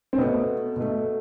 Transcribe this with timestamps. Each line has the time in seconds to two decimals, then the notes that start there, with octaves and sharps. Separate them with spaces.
0.13 C4
0.18 B2 A3 B3
0.76 B2 A3